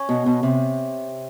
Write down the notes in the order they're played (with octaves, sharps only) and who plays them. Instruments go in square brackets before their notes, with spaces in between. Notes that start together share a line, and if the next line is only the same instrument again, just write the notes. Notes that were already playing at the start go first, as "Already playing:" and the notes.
Already playing: [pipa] C#4
[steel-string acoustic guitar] B2
B2
C3